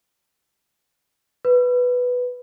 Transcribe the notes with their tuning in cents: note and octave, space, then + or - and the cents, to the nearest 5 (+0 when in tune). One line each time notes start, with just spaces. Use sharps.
B4 +0